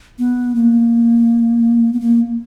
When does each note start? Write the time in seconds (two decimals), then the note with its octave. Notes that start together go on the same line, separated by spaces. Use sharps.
0.19 B3
0.55 A#3
1.93 B3
2.01 A#3